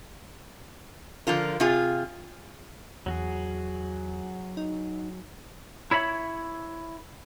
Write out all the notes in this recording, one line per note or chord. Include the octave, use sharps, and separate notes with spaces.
D3 F3 F4 A#4
C3 F4 G#4
E2 F#3 F#4 G#4
D#4
E4 C#5 E5 B5